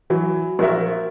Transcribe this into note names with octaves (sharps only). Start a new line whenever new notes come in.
E3 F#3
A#1 F#4 A#4 E5